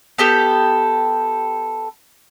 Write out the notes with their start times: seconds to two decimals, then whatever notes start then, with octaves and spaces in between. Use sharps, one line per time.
0.18 B3 G4 A4